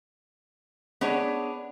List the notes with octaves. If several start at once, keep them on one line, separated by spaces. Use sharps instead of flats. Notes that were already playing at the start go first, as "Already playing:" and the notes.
B3 D4 G#4 C#5